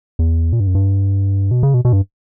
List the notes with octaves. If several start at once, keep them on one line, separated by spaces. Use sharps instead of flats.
E2
A#2
G2
F#2
G2
B2
C#3
B2
B2
G2